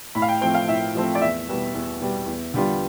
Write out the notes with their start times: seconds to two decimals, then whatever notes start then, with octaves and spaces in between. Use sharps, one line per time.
0.15 A2 B5
0.22 F5
0.28 G5
0.41 F3 A3 C4 G5
0.55 F5
0.68 A2 E5
0.95 F3 A3 C4
1.15 D5
1.21 E2 E5
1.48 B2 G3
1.74 E2
2.01 B2 G3
2.26 E2
2.54 D3 G3 B3 F4